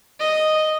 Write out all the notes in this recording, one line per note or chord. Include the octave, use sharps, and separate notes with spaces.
D#5